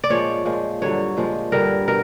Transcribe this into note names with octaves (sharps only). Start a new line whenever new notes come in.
D5
A#2 F3 G#3 C#5
A#2 F3 G#3
G2 D3 F#3 C#5
A#2 F3 G#3
G2 D3 G3 A#4
B2 A#4